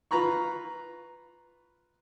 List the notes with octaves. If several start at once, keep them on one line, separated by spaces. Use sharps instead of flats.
F4 B4 A#5 B5 C#6